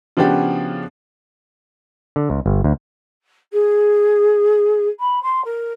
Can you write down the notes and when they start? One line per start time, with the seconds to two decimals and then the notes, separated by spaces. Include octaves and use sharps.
0.17 C#3 F3 B3 D4 F#4 G4
2.16 D3
2.30 C#2
2.46 G1
2.64 D2
3.52 G#4
4.99 B5
5.22 C6
5.44 A#4